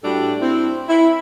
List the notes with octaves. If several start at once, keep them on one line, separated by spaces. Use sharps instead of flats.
A2 G3 D4 F#4 G4 A4
C4 E4
E4